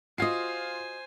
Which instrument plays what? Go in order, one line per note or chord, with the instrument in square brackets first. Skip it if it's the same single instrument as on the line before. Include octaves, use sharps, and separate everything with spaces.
[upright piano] F4 C7 [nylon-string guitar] F#4 D#5 [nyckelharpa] C5 G#5